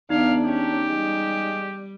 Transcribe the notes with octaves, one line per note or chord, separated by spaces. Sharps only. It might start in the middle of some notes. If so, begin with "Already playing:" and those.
E2 B3 D4 D#4 D5 F5
C#4 G4
G3 G#3